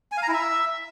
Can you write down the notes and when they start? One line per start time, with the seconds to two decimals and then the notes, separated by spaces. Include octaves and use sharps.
0.12 G#5
0.17 F5
0.23 A#5
0.28 E4
0.34 E5